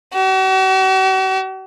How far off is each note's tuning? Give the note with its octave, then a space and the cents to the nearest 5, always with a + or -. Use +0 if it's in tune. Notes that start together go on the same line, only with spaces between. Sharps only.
F#4 +45